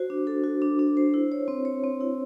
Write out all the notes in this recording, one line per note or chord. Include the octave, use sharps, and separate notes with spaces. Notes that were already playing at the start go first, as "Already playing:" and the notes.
Already playing: F#4 C5
D4
A4
F#4
D4
D4
C5
E4
C#5
C4
C#5
C4
E4